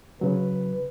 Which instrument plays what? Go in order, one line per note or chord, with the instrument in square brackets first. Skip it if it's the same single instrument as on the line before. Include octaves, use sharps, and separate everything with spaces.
[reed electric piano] C#3 F#3 [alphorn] B4